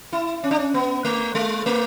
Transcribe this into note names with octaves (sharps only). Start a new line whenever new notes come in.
E4
C#4
D4
C#4
B3
A3
G#3
A3